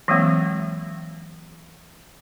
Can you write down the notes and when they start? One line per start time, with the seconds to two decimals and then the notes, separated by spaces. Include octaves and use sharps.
0.08 E3 F#3 G#3 A#3 C4